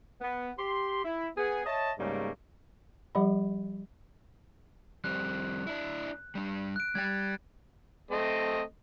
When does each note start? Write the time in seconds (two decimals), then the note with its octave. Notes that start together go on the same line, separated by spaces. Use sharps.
0.21 B3
0.58 G4 C6
1.04 E4
1.37 B3 G#4
1.66 C#5 D#5 E5 A5
1.99 G#2 C#3 G3 A3 A#3
3.15 F3 G3 G4 D5 F#5 B5
5.04 F2 G3 C4 F#6
5.67 D4 E4
6.35 G3 D4
6.76 F#6 D7
6.95 G3 G4 G5 G#6 A6
8.11 A3 C4 D#5